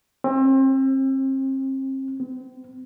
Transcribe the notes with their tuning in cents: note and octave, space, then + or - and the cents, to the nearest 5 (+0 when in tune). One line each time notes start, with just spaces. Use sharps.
C4 +35
C4 -35